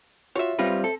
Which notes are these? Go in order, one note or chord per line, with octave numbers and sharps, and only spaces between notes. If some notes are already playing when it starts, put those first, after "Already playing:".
F4 F#4 C#5 E5
G3 C4 F4 B4 A#6
A4